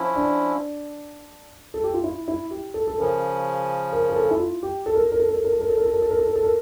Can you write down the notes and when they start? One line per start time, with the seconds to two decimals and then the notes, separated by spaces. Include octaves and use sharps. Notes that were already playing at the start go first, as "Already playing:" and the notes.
Already playing: F3 C#4 E4
0.15 D4
1.74 A4
1.84 G4
1.94 F4
2.04 E4
2.28 E4
2.51 G4
2.74 A4
2.87 A4
2.98 C#3 F3 C#4 A#4
3.92 A#4
4.10 A#4
4.16 A4
4.31 E4
4.40 F4
4.63 G4
4.86 A4
4.95 A#4
5.03 A4
5.12 A#4
5.20 A4
5.28 A#4
5.36 A4
5.45 A#4
5.53 A4
5.61 A#4
5.70 A4
5.78 A#4
5.86 A4
5.94 A#4
6.02 A4
6.11 A#4
6.19 A4
6.27 A#4
6.36 A4
6.44 A#4